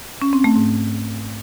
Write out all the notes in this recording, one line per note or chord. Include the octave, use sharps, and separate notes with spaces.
C#4
C4
A3
G#2